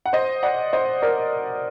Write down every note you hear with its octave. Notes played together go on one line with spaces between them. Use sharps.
F#5
C5 D#5
D5 F#5
C5 D#5
A#4 D5